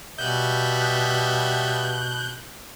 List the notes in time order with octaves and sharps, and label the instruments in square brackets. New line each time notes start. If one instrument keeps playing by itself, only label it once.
[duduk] B2 [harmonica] G3 B3 E5 [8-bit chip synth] F#6 G6